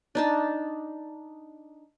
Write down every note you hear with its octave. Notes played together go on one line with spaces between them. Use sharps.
D4 D#4 A5